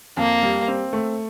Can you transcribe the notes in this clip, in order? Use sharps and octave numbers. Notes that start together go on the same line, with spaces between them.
F2 A#3
G3
C4
A3